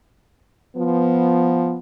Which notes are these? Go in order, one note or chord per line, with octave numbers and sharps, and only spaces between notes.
F3 B3